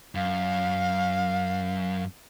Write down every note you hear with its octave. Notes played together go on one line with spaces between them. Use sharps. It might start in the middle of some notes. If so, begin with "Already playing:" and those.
F#2 F5